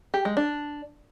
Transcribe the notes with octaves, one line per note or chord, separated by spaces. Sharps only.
G4
G#3
D4